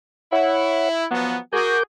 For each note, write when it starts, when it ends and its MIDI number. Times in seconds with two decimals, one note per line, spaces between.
0.32 1.04 64
0.32 0.89 73
0.32 0.89 78
1.11 1.37 53
1.11 1.37 54
1.11 1.37 59
1.11 1.37 78
1.53 1.77 66
1.53 1.77 68
1.53 1.83 70
1.53 1.83 86
1.53 1.83 91